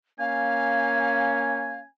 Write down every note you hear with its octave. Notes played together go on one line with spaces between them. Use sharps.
A#3 C#4 F5 G#5